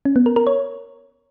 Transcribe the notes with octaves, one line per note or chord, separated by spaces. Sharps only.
C#4
B3
A#4
A#4
C#5